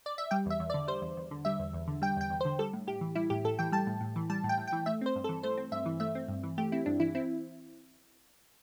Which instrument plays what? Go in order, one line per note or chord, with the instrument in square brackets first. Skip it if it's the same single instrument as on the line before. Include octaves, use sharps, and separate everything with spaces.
[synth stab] D5
E5
G3 G5
E2 E5
E2
D5
D3
G3 C5
E2
E2
D3
G3 E5
E2
E2
D3
G3 G5
E2 G5
E2
C5
D3
G3 A4
A2
A2 G4
E3
G3 E4
A2 G4
A2 A4
E3 G5
G3 A5
A2
A2
E3
G3 A5
A2
G5
A2
G5
E3
A3 E5
C4 C5
G2
A4
E3
A3 C5
C4
G2 E5
E3
A3 E5
C4
G2
E3
A3 G4
C4 E4
G2 D4
E3 E4
C4 E4